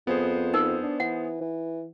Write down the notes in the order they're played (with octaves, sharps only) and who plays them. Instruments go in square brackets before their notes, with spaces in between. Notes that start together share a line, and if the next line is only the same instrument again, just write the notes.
[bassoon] F2 [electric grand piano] B3 G#4 C5
[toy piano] D#4 A#4
[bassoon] D4
[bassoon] E3 [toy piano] F#5
[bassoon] E3